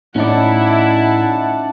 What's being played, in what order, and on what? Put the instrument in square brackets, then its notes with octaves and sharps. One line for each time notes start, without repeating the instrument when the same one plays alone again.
[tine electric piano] A2 [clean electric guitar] C#4 D#4 D5 [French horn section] E4 [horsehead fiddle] F#5 A5